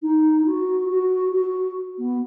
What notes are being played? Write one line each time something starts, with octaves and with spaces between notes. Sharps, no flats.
D#4
F#4
F#4
F#4
B3